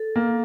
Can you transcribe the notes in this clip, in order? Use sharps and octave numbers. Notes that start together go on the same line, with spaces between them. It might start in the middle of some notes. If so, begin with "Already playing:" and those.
Already playing: A4
A#3